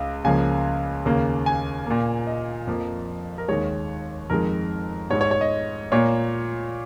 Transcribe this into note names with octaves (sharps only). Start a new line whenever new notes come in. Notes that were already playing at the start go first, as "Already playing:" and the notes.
Already playing: C#2 C#3
C#2 C#3 F3 A#3 G#5
D#2 C#3 A#3
G#5
A#2 A#3
D#5
F2 F3 A#3
A#4
D#2 D#3 G#3 C#5
F2 D#3 G#3 A#4
G#2 G#3 C#5
C#5
C#5
D#5
A#2 A#3 C#5